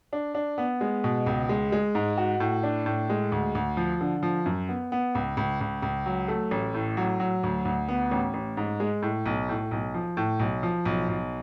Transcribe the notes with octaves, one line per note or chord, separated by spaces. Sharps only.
D4
D4
B3
G#3
B2
C#2
G#3
G#3
G#2
F#4
A2
D4
A2
G#3
D2
D2
F3
D3
F3
F#2
B3
B3
C#2
C#2
C#2
C#2
F#3
A3
A1
A2
F#3
F#3
D2
D2
B3
A1
A1
G#2
G#3
A2
B1
A2
B1
F3
A2
B1
F3
B1
B1